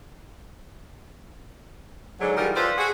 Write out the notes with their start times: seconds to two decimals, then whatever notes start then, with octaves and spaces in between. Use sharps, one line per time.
2.20 G#2 D3 F#3
2.37 E3 G3 D#4 F4 G#4 A#4
2.55 F4 A4 B4 C5 D5
2.78 F#4 G#4